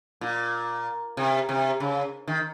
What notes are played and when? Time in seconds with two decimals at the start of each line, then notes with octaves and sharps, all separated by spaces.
0.21 A#2
1.17 C3
1.49 C3
1.80 C#3
2.28 D#3